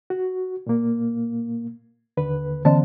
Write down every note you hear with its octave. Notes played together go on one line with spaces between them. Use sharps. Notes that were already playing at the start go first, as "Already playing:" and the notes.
F#4
A#2 A#3
D#2 D3 B4
D3 E3 A5